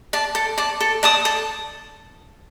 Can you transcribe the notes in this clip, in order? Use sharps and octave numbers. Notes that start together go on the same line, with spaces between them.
D5 A5
A4
D5 A5
A4
D5 A5 D#6
A4